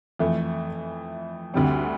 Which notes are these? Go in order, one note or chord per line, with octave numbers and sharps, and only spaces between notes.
F2 E3 A3
D2 D3 G3 C4